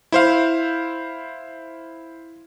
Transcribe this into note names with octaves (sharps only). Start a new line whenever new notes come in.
E4 C5 F5